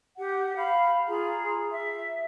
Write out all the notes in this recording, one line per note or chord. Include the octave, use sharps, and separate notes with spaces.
G4 F#5
F5 B5
F4 G#4 A#5
E5